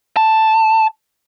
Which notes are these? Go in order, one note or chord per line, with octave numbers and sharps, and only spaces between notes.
A5